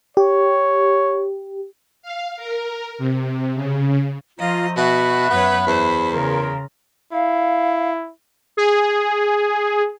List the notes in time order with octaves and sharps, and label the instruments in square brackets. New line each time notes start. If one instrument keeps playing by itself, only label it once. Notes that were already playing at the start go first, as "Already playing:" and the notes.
[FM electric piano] G4 [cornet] C#5
[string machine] F5
A#4
C3
C#3
[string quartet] F3 D#5 [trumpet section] A3 C5 A#5 [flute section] F4
[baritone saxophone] B2 [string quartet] F#4 [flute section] E5 F#6 [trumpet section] B5
[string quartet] F#2 B4 C#5 [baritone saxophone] B3
[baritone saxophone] E2 [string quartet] C5
[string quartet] C#3 [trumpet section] F4 A#5 C6 [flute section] A#4
[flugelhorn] E4 [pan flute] F5
[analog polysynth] G#4